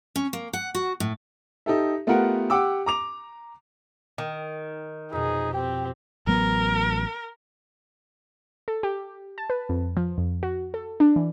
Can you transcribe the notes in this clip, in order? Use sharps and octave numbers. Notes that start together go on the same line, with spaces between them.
C#4
A#3
F#5
F#4
A2
D#4 G4 A4 E5
A3 B3 F4 G4 A#4 F#5
G4 F#5 G5 D6 E6
A#5 D6 F7
D#3
F2 B2 D#4 G#4
C4 G4 G5
A1 F#3 B3 A#4
A4
G4
A5
B4
F2
F3
F2
F#4
A4
D4
E3